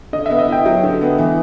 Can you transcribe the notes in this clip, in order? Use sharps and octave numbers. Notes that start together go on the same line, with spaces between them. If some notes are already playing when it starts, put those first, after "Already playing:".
D3 D#5
B3 E5
D#5
E4 G5
F#3
D3
B3
E3